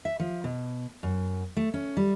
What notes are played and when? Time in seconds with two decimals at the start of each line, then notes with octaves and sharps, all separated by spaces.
0.05 E5
0.20 F3
0.44 B2
1.03 F#2
1.57 A3
1.74 C#4
1.97 G3